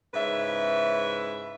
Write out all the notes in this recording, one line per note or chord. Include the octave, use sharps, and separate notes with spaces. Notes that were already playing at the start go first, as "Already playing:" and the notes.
G#2 C#3 E4 B4 E5